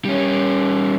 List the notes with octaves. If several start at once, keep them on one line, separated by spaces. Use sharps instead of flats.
G3 C#4